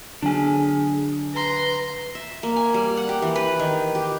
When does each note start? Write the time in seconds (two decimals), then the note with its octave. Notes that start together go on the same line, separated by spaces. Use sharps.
0.22 D3 F#3 D4 G#4 G#5
1.34 B4 A#5 C6
2.15 E5
2.43 A#3
2.56 G#5
2.74 G3
2.97 F#5
3.09 G4
3.22 E3
3.36 B4
3.59 D#3
3.95 G4